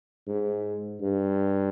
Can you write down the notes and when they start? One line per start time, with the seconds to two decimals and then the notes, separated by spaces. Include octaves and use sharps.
0.27 G#2
1.01 G2